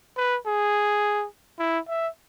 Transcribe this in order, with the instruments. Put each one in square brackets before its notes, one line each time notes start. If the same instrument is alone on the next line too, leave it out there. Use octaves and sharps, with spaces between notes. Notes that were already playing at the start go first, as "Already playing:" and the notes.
[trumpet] B4
G#4
E4
E5